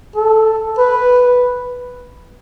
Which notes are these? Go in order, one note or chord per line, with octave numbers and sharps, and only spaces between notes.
A4
B4